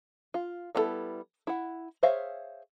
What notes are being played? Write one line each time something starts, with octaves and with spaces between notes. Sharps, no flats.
F4
G3 B3 D4 E4 A4
E4 F#5
G#4 C5 C#5 E5 F5